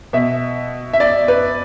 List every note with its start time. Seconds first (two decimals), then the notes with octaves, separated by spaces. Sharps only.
0.13 B2 E5
0.93 E5
1.00 D5
1.28 B4